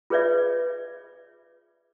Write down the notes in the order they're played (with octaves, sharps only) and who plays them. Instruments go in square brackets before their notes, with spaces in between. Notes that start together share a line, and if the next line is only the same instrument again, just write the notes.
[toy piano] F4 G#4 B4 C#5 D5 E5